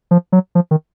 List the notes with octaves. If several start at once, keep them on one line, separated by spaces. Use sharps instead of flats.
F3
F#3
F3
D#3